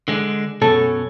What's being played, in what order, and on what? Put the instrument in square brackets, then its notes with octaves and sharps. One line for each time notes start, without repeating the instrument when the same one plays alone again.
[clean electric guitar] D3 G#3 D4
[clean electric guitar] F#2 B2 C#4 [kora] A4